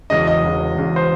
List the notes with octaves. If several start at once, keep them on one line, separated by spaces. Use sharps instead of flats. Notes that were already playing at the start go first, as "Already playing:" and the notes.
E1 E2 C#3 D#5
D#5
E1 E2 C#3
E1 E2 C#3
C5